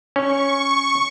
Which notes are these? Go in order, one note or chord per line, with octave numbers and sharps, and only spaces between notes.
C#4 C#6